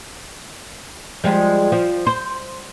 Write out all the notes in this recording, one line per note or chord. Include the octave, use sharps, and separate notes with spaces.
F3 G3 G#3
F3
C5